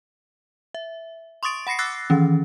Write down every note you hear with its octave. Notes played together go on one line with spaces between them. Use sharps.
E5
C6 C#6 D#6 A6 D7
F#5 B5 A#6 C7 C#7
D6 E6 F#6 A6 A#6 C7
D#3 E3 C#4